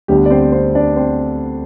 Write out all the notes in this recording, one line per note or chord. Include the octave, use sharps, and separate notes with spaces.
D2 D3 G3 B3 D4 G4
D5
C4 C5
C4 C5
D4 D5
C4 C5